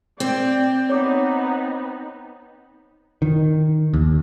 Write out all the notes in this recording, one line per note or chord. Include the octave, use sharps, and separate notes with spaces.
C4 D5 G5
B3 D#4 C#5 D6
D#3
D#2